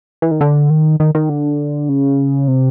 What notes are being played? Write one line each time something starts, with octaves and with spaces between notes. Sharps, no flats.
E3
D#3
D3
D#3
D#3
D#3
D3
C#3
C3